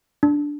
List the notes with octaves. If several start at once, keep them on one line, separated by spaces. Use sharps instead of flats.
D4